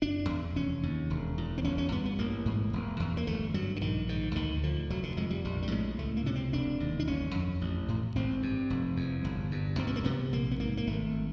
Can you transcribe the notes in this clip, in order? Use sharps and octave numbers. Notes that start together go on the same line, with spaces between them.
F#1 D4
E2
F1 C#4
D#2
E1
E2
C4
G1 C#4
C#4
G2 B3
B3
A1 A#3
G#2
E1
E2
A#3
G1 A3
G2 F#3
D3
A#1 D#3
G#2 D#3
D2 D#3
D3 F3
F1 F#3
D3
F2 G#3
G3
A#1 G3
G3
A2 G#3
C#2 A3
A#3
C3 C#4
C4
E1 D4
D#2
D4
G1 C#4
F2
A1
A2
G#1 C4
G2
F1
E2
G1
G2
C#2 C4
B3
A#3
C3 B3
A#1 A#3
B3
G#2 A#3
A#3
G#1 A3